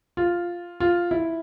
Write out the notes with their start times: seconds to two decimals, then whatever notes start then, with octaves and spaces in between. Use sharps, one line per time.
0.17 F4
0.80 F4
1.11 E4